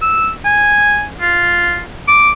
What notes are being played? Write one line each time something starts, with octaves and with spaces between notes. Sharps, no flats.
E6
G#5
F4
D6